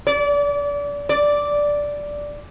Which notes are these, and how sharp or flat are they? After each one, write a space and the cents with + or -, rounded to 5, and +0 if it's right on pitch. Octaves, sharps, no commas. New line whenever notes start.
D5 -30
D5 -5